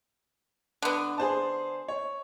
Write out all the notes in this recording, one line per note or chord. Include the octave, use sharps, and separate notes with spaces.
D3 B3
G#4 C5 A5
C#5